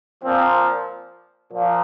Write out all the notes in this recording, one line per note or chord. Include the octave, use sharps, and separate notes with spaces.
A#2 F3 C4
A#2 F3